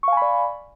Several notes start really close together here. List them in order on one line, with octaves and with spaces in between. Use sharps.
C#6 F5 G#5 B5 D5